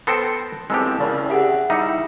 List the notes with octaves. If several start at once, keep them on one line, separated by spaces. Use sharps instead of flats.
B3 A4 C5 G5 A#6 C#7
F2 A2 G#3 B3 G4 A4 E6
C#3 E4 A#4 D5
G4 G#4 E5 F#5 G5
G3 D#4 E4 E5 F#5